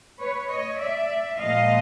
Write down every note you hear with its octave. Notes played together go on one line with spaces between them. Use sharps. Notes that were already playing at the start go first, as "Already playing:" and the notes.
B4 C#5
C#5 D#5
D5 E5
A#2 F3 G#3 D#5 F5